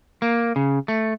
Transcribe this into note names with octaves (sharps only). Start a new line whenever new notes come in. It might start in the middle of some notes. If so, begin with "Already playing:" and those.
A#3
C#3
A3